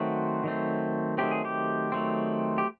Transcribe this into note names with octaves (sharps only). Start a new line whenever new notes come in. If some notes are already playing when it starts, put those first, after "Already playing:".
Already playing: D#3 F#3 A3 C4 F#4
D#3 F#3 A3 C4
D#3 F#3 A3 C4 G4
G#4
G4
D#3 F#3 A3 C4
G4